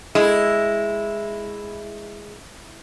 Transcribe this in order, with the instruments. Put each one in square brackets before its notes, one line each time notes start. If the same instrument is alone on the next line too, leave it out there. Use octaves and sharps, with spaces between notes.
[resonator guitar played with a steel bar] G#3 [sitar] E4